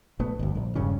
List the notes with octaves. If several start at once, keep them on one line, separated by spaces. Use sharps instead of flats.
A#1 A3 B3
G1 D2
A#1
E1 G2 C#3 C#4